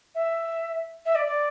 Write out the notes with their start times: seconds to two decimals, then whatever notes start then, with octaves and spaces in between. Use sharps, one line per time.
0.15 E5
1.06 E5
1.15 D5
1.26 D5